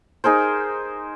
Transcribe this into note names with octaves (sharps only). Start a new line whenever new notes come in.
D#4 G#4 A#4 C5